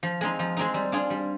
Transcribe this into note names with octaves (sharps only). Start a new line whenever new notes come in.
F3
G#3 C4 D#4
F3
G#3 C4 D#4
G3
D4 F4 G#4
G3